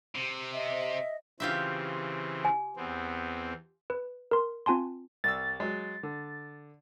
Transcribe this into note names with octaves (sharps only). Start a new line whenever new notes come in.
C3
D#5 E5
C#3 E3 C4 F4 G4 E5
G#5
E2 B3 C4
B4
A#4 C6
C4 F4 G#5 A5 C6
C2 E6 A6
F#3 G#3
D3